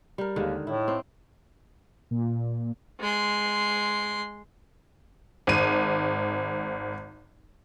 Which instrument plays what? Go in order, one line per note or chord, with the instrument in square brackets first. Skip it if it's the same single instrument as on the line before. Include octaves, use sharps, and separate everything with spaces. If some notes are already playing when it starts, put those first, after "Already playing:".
[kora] G3 A#4
[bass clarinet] D#2 [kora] D3 D#3 G#3
[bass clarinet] A2 [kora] E4
[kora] C4
[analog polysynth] A#2
[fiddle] G#3 C6
[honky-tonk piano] G#1 D#7